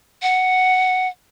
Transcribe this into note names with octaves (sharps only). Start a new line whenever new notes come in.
F#5